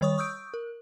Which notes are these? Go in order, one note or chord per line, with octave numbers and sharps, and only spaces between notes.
D#3 G3 C#5 C#6 D#6
C#6 D#6 E6 G6 D7
A#4